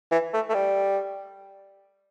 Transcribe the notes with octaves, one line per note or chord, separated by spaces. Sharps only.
E3
A3
A3
G3